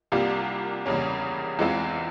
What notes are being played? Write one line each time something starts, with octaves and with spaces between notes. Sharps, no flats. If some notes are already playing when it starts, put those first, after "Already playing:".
C2 C3 G3 A#3 F4
E2 C#3 G3 A#3 C#4
E2 E3 G#3 C4 F4